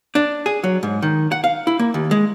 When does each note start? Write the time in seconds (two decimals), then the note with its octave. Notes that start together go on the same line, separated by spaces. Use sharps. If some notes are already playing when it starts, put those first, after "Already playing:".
0.15 D4
0.46 G#4
0.64 F#3
0.83 G#2
1.02 D#3
1.32 F#5
1.44 F5
1.67 E4
1.79 A#3
1.94 D#2
2.11 G#3